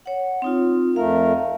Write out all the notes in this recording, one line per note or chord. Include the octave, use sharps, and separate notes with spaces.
C#5 F#5
C4 D#4 F4
F2 A3 A#4 F5